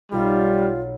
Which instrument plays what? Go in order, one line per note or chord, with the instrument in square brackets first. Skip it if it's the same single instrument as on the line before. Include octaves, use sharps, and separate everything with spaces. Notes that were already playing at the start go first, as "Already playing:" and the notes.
[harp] B1 [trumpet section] G3 [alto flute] F4